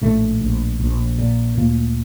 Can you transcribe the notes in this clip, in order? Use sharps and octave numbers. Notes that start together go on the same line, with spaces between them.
A#1 A2 A3
A#1
A#1
A#2
D2 A#2 A#3